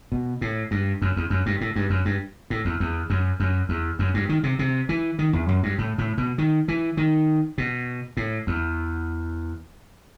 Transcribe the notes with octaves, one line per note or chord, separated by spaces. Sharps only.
B2
A2
G2
F#2
E2
F#2
G2
A2
G2
F#2
G2
A2
E2
E2
F#2
F#2
E2
F#2
G2
D#3
C3
C3
E3
D#3
E2
F#2
G2
A2
A2
B2
D#3
E3
D#3
B2
A2
E2